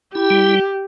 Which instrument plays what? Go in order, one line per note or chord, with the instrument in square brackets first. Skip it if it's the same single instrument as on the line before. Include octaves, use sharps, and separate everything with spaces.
[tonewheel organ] E4 [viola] G4
[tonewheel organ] G3